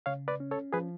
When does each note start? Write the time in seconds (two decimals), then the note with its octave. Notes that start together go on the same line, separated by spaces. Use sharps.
0.06 C#3 C#5 F5
0.28 B4 D5
0.40 C#4
0.51 A4 C#5
0.73 F3 G#4 B4